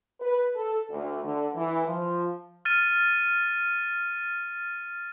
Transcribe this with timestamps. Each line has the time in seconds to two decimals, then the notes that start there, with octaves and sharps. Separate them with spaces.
0.20 B4
0.56 A4
0.90 D2
1.24 D3
1.54 E3
1.86 F3
2.65 F6 A6 D#7